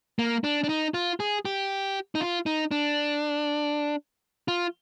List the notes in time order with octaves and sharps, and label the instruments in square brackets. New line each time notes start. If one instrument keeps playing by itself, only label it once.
[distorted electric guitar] A#3
D4
D4
D#4
F4
G#4
G4
D#4
F4
D#4
D4
F4